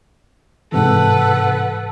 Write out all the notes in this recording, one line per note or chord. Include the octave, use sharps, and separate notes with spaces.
G#2 C3 E3 A4 B4 F#5